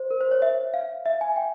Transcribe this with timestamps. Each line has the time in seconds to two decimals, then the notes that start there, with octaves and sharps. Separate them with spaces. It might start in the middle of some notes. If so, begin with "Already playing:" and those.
Already playing: C5
0.11 A#4
0.21 C5
0.31 C#5
0.42 E5
0.74 F5
1.06 E5
1.21 G#5
1.36 G5